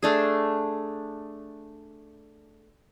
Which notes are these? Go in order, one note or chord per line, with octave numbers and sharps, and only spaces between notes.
A3 D4 G#4